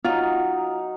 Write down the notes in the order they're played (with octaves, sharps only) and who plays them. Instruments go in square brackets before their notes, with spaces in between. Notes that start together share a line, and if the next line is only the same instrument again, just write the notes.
[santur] F#3 D#4 [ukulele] F4